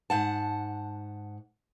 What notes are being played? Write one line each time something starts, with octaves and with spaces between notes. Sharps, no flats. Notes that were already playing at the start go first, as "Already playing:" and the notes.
G#2 F#5 A5